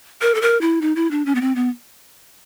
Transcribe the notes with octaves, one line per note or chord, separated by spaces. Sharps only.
A#4
A4
A#4
E4
D#4
E4
D4
C#4
B3
C4
B3